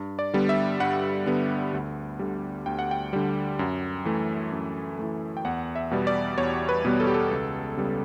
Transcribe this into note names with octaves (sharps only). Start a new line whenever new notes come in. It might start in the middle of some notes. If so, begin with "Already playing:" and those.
Already playing: G2
D5
D3 G3 B3
E5
G2 F#5
D3 G3 B3
D2
D3 G3
D2 G5
F#5
G5
D3 G3
F#2
E3 A3
F#2
E3 A3
G5
E2 F#5
E5
B2 G3 B3
D5
E2 C#5
B4
B2 G3 B3
A4
G4
A4
C#2
C#3 G3 B3